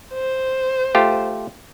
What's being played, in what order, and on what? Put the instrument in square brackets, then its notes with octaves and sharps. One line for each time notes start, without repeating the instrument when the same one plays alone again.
[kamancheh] C5
[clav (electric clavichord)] A3 F4 G4